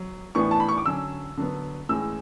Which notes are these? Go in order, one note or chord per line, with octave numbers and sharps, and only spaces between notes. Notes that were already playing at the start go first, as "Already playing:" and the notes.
Already playing: F#3
A2 E3 B3 D4 C#6
A5
B5
C#6
D6
D3 F#3 C#4 E6
D3 F#3 B3
A2 E3 G#3 C#4 E6